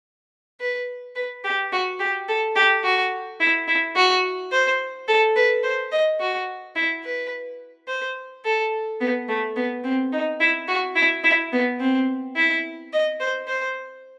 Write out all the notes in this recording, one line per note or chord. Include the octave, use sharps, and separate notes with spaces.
B4
B4
G4
F#4
G4
A4
G4
F#4
E4
E4
F#4
C5
A4
B4
C5
D#5
F#4
E4
B4
C5
A4
B3
A3
B3
C4
D#4
E4
F#4
E4
E4
B3
C4
E4
D#5
C5
C5